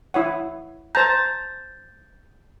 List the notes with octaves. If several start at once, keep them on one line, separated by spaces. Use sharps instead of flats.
E4 C#5 F#5
C5 A5 A#5 G6 A6